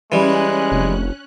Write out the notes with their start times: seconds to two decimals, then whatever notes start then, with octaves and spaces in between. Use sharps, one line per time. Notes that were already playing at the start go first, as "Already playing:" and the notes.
0.12 E3 G3 G#3 C#4 F#6
0.72 F1